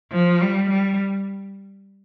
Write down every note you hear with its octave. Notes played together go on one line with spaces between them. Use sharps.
F3
G3
G3